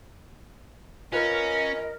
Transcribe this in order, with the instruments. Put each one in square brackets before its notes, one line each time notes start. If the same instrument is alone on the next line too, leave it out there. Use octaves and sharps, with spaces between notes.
[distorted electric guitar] C#4 [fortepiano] F4 B4 [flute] A#4 [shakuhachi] D#5